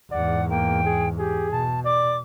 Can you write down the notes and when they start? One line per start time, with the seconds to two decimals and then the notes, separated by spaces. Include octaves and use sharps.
0.11 E2 G#2 D5 F#5
0.50 A#3 G5
0.85 G#4
1.18 G4 G#4
1.51 B2 A5
1.85 D5 D6